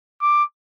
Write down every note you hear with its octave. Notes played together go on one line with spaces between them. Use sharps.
D6